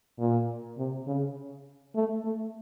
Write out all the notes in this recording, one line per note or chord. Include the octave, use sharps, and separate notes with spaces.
A#2
C3
C#3
A3
A3